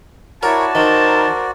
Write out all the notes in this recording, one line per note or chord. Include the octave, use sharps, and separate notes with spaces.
E4 F#4 A#4 C#5 D5 A5
D#3 A#4 C5